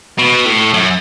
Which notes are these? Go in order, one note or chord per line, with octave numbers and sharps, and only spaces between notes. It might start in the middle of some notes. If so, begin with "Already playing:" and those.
B2
A2
F#2